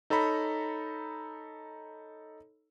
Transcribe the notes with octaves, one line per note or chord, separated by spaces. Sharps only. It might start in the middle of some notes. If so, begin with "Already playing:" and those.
D#4 A4 C#5 A#5 B5